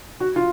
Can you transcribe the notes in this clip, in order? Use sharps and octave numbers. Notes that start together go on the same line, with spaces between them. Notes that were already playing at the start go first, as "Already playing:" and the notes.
F#4
F4